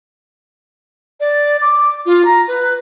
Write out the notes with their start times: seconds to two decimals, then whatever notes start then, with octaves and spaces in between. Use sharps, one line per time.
1.20 D5
1.61 D6
2.06 F4
2.25 A#5
2.48 B4